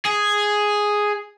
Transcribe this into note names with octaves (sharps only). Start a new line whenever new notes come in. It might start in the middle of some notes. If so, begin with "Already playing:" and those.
G#4